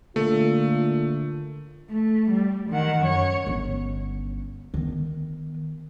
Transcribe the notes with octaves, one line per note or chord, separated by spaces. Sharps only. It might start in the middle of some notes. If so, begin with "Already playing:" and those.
A#2 D3 A3 F4
A3
G3
D#3 F#5
F#2 C#5
G1 C#4
D#3 B3